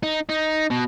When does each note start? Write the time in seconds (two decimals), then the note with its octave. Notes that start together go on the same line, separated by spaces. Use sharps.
0.03 D#4
0.29 D#4
0.71 B2